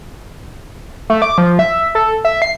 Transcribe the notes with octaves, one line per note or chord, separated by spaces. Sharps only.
A3
D6
F3
E5
A4
E5
C7